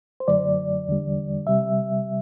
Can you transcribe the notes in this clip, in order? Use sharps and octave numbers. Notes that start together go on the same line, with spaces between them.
C5
F#2 D3 F#3 A3 D5
E2 D3 G3
C3 G3 E5